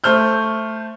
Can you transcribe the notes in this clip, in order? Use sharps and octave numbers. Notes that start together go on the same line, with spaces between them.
A3 C5 F6 G6